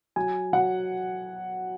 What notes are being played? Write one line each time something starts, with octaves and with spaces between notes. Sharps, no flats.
F#3 G#5
F#3 F#5